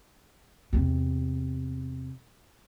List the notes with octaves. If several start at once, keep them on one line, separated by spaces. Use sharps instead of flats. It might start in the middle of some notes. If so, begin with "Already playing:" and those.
E2 C3